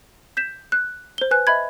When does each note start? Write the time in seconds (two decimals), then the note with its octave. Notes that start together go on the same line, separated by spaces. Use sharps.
0.37 G6 B6 E7
0.72 F#6
1.18 C5 G7
1.31 B4 G#5 F#6
1.47 D#5 E5 B5 G#6